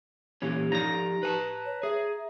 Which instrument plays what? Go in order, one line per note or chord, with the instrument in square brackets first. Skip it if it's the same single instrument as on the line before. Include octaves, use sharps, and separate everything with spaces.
[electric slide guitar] A#2 E3 C#4 [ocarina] G4
[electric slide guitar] F3 D#4 D5 [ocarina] G4 [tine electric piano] A#5 A#6
[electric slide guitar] B4 G#5 A5
[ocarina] C#5
[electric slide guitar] G#4 [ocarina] E5